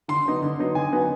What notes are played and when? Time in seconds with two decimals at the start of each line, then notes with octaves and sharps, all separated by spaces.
0.08 D3 C6
0.25 F#3 B3 D#4
0.42 D3
0.59 F#3 B3 D#4
0.75 D3 G#5
0.92 F#3 B3 D#4